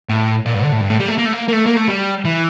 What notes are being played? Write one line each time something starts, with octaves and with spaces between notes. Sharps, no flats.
A2
A#2
G2
D3
A2
G2
A2
G3
A3
A#3
A3
A#3
A#3
A3
A#3
A3
G3
E3